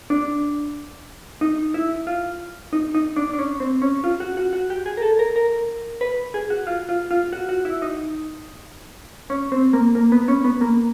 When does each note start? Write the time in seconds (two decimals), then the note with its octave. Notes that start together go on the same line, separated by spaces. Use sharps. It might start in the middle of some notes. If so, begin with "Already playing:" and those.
0.10 D4
1.41 D#4
1.74 E4
2.07 F4
2.73 D#4
2.95 D#4
3.16 D4
3.33 D4
3.39 C#4
3.60 C4
3.82 C#4
4.04 F4
4.20 F#4
4.37 F#4
4.53 F#4
4.70 G4
4.86 G#4
4.97 A#4
5.02 A4
5.19 A#4
5.36 A#4
6.01 B4
6.34 G#4
6.50 F#4
6.67 F4
6.89 F4
7.11 F4
7.33 F#4
7.49 F#4
7.65 E4
7.82 D#4
9.30 C#4
9.52 C4
9.73 A#3
9.95 A#3
10.12 B3
10.28 C#4
10.44 B3
10.61 A#3